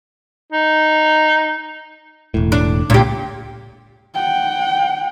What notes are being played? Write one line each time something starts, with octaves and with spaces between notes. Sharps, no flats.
D#4
E1 A2
D4
C#2 A#2 G4
F#5 G5